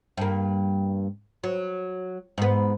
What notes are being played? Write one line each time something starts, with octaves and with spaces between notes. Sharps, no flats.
G2 A#3
F#3
G#2 B3